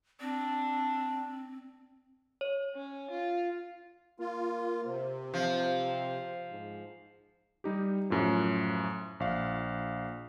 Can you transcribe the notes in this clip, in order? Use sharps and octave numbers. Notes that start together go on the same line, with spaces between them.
C4 D4
C#5
C#4
F4
A#3 F4
C3 C5
F3 C4
G#2
G3 D#4 G4
F#2 A2 F3
A#1 F5